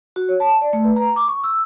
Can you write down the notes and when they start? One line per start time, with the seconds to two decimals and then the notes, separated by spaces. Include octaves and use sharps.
0.16 F#4
0.29 C#5
0.40 A5
0.62 D5
0.73 A3
0.84 B4
0.96 A#5
1.16 D6
1.28 C#6
1.44 E6